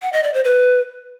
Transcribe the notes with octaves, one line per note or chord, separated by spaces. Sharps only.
F#5
D#5
D5
C5
B4